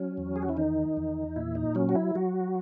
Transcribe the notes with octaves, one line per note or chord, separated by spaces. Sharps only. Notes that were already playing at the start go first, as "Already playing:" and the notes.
Already playing: F#3 C#4
E2
G#4
F#4
E4
D#3 D#4
E2
A#2 E4
D#4
F#3 C#4
F#4
E4
F#3 F#4